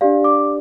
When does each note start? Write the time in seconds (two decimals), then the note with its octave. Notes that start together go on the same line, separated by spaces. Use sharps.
0.01 D4 G4 D5 F5
0.24 D6